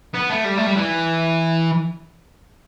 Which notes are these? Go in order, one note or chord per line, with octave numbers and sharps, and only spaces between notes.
B3
A3
G3
A3
G3
E3